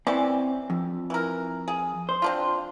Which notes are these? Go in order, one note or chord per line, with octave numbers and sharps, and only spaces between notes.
E3 C4 C#4 D5
F2
E3 A#4
G#4
C5
C4 D4 F4